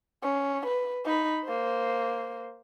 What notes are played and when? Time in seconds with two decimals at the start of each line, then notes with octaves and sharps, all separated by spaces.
0.22 C#4
0.66 B4
1.05 D#4 B5
1.44 A#3 C5